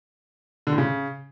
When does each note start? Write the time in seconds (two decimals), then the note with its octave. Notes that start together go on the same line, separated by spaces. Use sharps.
0.67 D3
0.72 A2
0.78 C#3